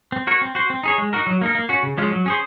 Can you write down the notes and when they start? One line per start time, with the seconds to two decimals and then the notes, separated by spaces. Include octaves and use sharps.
0.12 C4
0.27 F#4 A#4 C#5
0.41 C4
0.55 F#4 C5
0.70 C4
0.83 D#4 G#4 C#5
0.98 G#3
1.13 D#4 F#4 A#4
1.27 F#3
1.41 A#3 D#4 A#4
1.55 A#3
1.69 C#4 F#4
1.83 C#3
1.98 F3 G#3 C#4 F4
2.12 F#3
2.26 C#4 G#4 C5